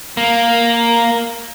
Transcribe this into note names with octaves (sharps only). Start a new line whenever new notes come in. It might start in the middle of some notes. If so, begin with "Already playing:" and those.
A#3